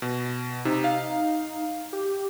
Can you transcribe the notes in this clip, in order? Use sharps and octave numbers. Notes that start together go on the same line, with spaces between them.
B2
C3 D#4
F5
G4